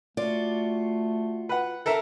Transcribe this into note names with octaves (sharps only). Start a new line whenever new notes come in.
A3 F4 F#4 D5
B4 F#5
A4 A#4 E5